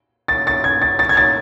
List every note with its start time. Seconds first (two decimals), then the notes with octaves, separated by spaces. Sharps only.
0.28 A6
0.47 A6
0.64 G#6
0.82 A6
0.99 A6
1.09 G#6
1.17 A6